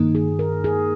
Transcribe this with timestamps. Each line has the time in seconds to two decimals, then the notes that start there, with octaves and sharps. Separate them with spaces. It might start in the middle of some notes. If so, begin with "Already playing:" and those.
Already playing: G2 D#3 A#3 D#4
0.15 G#4
0.39 A#4
0.64 G#4